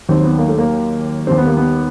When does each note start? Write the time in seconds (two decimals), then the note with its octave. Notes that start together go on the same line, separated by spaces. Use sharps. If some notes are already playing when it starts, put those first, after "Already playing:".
0.09 D#2 D#3 F#3 C4
0.23 B3
0.39 A#3
0.48 A3
0.58 A#3
1.27 D#2 D#3 G3 C4
1.38 B3
1.47 A#3
1.57 B3